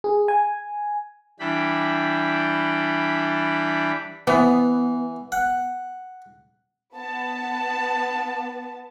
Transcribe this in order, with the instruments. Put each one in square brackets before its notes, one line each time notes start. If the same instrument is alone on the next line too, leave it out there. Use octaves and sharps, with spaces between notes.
[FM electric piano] G#4
G#5
[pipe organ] E3 G3 D4 G5 B5
[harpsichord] E3 [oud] B3
[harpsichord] F#5
[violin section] B3 A5